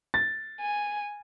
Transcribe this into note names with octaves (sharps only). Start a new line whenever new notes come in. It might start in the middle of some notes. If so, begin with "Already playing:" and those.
A6
G#5